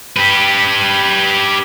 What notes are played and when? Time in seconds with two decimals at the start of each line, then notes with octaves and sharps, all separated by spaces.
0.16 G4 B4